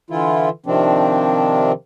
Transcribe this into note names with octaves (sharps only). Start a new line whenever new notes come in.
D3 E3 E4 F4
C3 D#3 F3 C4 D4